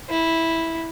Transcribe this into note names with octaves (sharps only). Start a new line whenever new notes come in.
E4